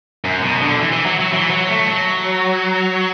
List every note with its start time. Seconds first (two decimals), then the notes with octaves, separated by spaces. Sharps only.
0.25 F#2
0.42 B2
0.61 D3
0.79 E3
0.92 E3
1.06 F#3
1.20 F#3
1.33 E3
1.51 F#3
1.69 A3
1.86 F#3